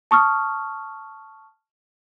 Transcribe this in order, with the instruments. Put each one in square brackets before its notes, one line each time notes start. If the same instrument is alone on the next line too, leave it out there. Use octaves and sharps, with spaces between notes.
[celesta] A5 C#6 D#6 F6